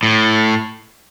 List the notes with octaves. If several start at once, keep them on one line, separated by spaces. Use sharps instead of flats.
A2